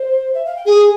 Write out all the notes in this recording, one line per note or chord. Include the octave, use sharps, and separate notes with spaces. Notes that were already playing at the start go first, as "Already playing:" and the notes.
Already playing: C5
E5
F5
G5
G#4 G#5